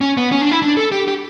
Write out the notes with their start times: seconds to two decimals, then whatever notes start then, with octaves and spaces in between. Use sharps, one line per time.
0.01 C#4
0.17 B3
0.32 C#4
0.41 D4
0.51 E4
0.62 D4
0.77 A4
0.92 G4
1.08 G4